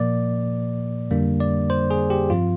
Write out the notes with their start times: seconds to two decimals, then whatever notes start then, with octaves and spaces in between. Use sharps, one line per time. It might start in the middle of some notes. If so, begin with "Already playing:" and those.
Already playing: A#2 F3 A#3 D5
1.10 F2 D3 G3 A#3 D4
1.40 D5
1.70 C5
1.91 G#4
2.10 G4
2.30 G2 F3 C4 F4